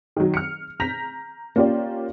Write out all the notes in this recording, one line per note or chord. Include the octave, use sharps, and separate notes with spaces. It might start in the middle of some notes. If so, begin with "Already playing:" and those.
D#3 F#3
F6 C#7
A#5 G6 A#6 B6 F7
A#3 C#4 F4 G4 D5